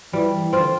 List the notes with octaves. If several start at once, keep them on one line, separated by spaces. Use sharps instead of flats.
E3 G3
E3
C4 F4
D3